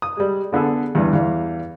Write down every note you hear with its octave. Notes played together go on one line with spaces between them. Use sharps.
D#6
G3 G#3
D3 B3 G#4 A4
E2 G2
E2 G3 G4 F5